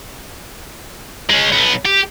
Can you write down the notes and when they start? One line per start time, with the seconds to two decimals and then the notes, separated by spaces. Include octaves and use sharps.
1.30 G#3 C#4
1.52 B1 B3
1.86 G4